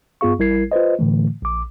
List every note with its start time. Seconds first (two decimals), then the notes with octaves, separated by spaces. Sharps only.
0.21 G2 B3 F4 G#4 F5 C#6
0.39 A1 G3 E4 A#4 G#6 C7
0.72 F4 B4 C5 D#5
0.99 A2 D3 E3 A3
1.42 A#1 D6